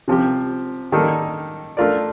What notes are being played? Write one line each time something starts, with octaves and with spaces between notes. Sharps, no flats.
C3 F3 C4 G4
D#3 G3 A#3 D#4 A4
A3 D4 F4 A#4 D5